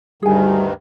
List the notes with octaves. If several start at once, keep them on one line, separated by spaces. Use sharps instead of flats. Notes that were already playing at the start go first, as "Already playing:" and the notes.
D2 G2 D#3 G3 G#4 G#5